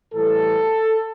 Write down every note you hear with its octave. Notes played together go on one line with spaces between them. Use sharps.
A2 E3 G3 A4